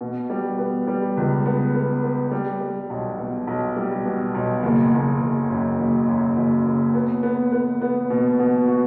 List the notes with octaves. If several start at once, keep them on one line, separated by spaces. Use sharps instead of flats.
B2
G3
B3
G3
C#2
B3
B3
B3
G3
G3
B1
B2
B1
G3
B2
B1
F#1
F#1
F#1
F#2
F#1
F#2
F#1
F#1
B3
B3
B3
B3
B2
B2
F#4